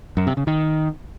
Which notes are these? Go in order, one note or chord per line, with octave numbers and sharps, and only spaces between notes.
F#2
C3
C#3
D#3